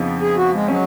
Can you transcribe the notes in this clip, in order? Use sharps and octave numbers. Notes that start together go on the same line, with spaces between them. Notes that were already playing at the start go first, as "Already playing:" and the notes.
Already playing: F2 C#3 F3 B3 D#4
G#4
F#4
G#3
F#3 G#3 C#4